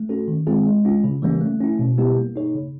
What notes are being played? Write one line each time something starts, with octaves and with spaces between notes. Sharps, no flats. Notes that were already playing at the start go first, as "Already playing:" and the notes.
Already playing: A3
C#4 F#4 A4
D#3
G#3 C4 F4 G#4
G#3
C#4 F4
C#3
E3 G3 A#3 C#4
A3
C#4 E4
B2
G3 B3 E4 G4
A#3
D#4 G#4 C#5
C#3